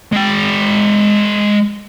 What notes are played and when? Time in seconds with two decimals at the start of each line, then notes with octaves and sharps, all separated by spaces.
0.12 G#3 G5